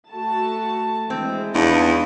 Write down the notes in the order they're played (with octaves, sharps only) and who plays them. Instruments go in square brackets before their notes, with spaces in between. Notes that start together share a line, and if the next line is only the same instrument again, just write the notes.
[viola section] A3 F#4 A5
[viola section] E3 G#3 [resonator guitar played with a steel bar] C4
[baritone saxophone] E2 [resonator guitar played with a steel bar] D4 [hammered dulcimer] D#4 F4